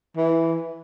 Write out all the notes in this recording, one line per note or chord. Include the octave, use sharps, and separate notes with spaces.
E3